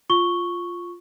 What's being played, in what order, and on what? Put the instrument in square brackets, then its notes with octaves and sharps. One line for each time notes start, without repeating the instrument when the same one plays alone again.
[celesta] F4 C#6 G7